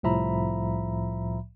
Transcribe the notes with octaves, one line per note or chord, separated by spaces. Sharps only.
C2 A2 F3 E5 A#5 B5